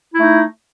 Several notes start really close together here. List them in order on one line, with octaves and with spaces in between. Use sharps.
E4 A3 D#4